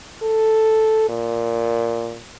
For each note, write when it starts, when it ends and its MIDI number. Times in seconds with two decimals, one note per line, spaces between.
0.22 1.08 69
1.09 2.18 46